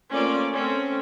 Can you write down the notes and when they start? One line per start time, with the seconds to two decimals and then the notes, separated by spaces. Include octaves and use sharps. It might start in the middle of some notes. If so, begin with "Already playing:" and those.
0.10 A3 A#3 C4 C#4 F4 D5
0.52 A3 C4 C#4